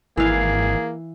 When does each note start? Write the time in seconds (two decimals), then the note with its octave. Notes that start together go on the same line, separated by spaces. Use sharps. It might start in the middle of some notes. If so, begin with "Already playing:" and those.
0.17 G#1 E3 A#3 G#4 F5